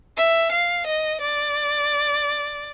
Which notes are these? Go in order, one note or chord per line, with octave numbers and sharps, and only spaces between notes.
E5
F5
D#5
D5